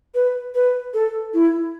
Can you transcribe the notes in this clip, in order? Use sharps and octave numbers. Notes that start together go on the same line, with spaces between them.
B4
B4
A4
E4